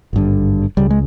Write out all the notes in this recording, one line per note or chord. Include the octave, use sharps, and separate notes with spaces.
G#1 G2 D3
C#2 C#3 G3
G#3